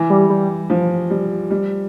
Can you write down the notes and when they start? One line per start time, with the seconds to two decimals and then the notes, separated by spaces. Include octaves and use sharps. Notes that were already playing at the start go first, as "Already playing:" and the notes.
Already playing: E3
0.10 G3
0.30 G3
0.70 F3
1.10 G3
1.50 G3